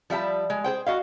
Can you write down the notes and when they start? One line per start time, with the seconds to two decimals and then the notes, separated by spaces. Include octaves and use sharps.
0.10 F3 G3 E5 A5
0.50 G#3
0.64 G#4 C5 G5
0.86 F#4 D#5 F5